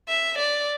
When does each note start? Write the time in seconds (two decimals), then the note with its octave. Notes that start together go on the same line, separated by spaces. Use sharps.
0.08 E5
0.38 D5